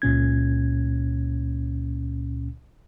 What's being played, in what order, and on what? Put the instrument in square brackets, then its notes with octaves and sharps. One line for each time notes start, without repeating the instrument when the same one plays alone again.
[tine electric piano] C#2 A#2 C#4 G#6